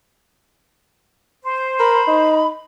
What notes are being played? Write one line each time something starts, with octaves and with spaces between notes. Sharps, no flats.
C5
A#4 B5
D#4